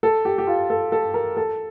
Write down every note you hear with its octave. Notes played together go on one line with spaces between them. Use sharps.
A4
G4
G4
F4
A4
A4
A#4
A4